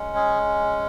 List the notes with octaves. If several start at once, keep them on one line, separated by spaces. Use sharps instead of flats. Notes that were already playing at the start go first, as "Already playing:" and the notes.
Already playing: G#3 C#4
G#4